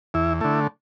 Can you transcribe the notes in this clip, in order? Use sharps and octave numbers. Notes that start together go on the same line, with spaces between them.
E2 E4
D3 A3 E4